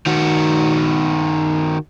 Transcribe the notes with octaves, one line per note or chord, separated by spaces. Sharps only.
D#3 F#4